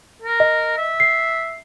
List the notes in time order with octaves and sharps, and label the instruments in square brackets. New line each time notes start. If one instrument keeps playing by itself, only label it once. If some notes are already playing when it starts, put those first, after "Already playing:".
[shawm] A#4
[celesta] D#5
[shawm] E5
[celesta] C7